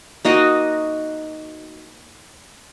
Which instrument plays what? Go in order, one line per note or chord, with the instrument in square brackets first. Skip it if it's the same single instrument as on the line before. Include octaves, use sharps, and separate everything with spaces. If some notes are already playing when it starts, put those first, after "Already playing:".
[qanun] A#3 D#4 F#4 D#5